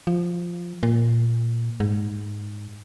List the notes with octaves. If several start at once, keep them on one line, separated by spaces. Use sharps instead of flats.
F3
A#2
G#2